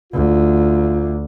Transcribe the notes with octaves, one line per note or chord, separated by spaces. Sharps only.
D2 F4